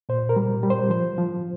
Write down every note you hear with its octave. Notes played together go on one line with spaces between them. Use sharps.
A#2 C5
A#4
G3
G3
C5
F3 C5
F3